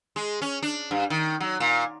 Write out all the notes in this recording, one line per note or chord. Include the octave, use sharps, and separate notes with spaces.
G#3
C#4
D4
G2
D#3
F#3
A#2